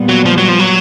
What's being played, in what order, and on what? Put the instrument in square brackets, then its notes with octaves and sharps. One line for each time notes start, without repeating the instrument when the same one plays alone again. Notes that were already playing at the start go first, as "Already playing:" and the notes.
Already playing: [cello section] A#2 G3 B3
[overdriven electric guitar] F#3
F3
F#3
F3
F#3